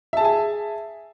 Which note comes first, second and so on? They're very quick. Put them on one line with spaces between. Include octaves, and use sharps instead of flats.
E5 A5 G#4 G#5